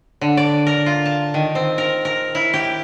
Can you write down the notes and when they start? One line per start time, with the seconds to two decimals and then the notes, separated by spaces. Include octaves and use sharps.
0.21 D3
0.37 D5
0.66 A#4
0.86 F4
1.05 A5
1.34 D#3
1.55 C4
1.78 A#4
2.05 A#4
2.35 E4
2.54 G4